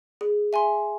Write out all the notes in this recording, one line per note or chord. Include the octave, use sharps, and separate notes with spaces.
G#4
E5 G#5 C6